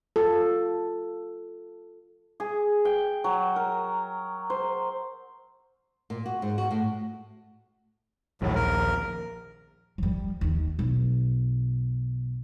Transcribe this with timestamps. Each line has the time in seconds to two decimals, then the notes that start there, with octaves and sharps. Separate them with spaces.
0.16 F4 A4
2.40 G#4
2.85 G5
3.24 F#3
3.56 A#4
4.50 C5
6.10 A#2
6.26 F#4
6.42 G#2
6.58 F#4
6.71 A2
8.42 A#1 D#2 A2 F#3
8.55 A#4
9.98 F3 G3
10.41 D#2 D#3
10.79 B1